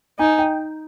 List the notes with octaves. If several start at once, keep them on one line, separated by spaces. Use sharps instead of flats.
D#4 G#5
G5